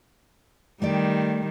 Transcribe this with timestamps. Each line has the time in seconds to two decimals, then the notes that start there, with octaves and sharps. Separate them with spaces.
0.82 D#3 G3 A3 G4 D5